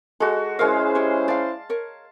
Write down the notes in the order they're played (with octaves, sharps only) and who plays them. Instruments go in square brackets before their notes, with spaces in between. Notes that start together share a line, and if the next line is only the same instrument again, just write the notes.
[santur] G#3 F#4 [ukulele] A4
[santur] G#3 F5 [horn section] C#4 E4 C5 [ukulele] A#4 C#5
[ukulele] G4 C#5
[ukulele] D5 F5 [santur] A5
[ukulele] A#4 C#5